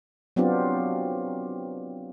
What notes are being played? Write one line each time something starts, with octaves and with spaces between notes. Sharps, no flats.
F#3 B3 C4 D4 F4 G4